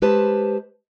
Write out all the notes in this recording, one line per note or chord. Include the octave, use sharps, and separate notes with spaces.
G#3 G4 B4 C5 A5